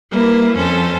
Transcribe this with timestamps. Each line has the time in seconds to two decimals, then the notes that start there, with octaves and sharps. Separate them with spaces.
0.10 G3 A#3 E4 B4
0.56 F2 C#4 A4 C5